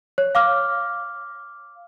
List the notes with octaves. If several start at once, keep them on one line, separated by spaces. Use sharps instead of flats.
C#5
F5 D6 F6